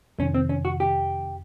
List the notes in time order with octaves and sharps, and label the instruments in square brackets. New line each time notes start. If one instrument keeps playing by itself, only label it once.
[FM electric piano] F2 C3 D#3 [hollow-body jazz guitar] C#4
[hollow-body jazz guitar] C4
C#4
F#4
G4